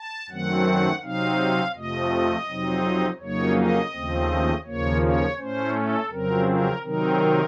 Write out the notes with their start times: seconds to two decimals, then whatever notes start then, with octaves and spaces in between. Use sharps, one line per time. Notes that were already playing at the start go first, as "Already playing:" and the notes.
Already playing: A5
0.30 F#2 D#3 F#3 A3 C4 F#5
1.02 C3 F#3 C4 D#4 F5
1.75 F2 C3 F3 A3 D#5
2.48 F2 C3 F#3 C4 D#4
3.20 F2 C#3 F#3 A#3 D#4 C#5
3.56 D#5
3.92 D#2 C#3 F3 A3 C4
4.65 D#2 C#3 F3 A#3 C#5
5.01 C#5
5.37 A2 A3 C#4 C5
5.73 A4
6.10 F2 C#3 F#3 C4 A#4
6.46 A#4
6.83 C3 D#3 F#3 C4 D#4 A#4